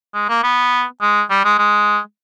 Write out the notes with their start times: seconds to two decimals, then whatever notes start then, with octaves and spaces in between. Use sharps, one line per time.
0.14 G#3
0.29 A#3
0.43 B3
1.02 G#3
1.30 G3
1.45 G#3
1.59 G#3